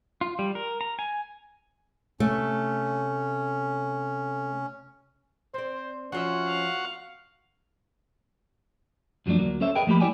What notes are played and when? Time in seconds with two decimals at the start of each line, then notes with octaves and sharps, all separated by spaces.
0.21 F4
0.39 G3
0.55 A#4
0.81 A#5
0.99 G#5
2.20 C3 A3 C#4
5.54 C4 C5 D5
6.12 F3 C#4 F4 F#4 E5 F#5
6.47 F5
9.26 F#2 F3 F#3 G#3 A3 D4
9.38 D2 G2 F#3 A#3
9.61 C#4 A4 C5 E5
9.76 G#4 A#4 B4 D#5 G5
9.87 F3 A3 A#3 G4 B5
10.00 G3 E4 C#5 D5 G5 G#5